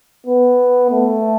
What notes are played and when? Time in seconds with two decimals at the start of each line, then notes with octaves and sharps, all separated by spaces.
0.27 B3
0.91 A3